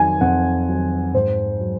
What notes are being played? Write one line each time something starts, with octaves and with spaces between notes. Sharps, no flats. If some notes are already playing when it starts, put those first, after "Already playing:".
Already playing: F2 D#3 F#3 G#5
F2 F#5
D#3 F#3
G#2 C5
F#3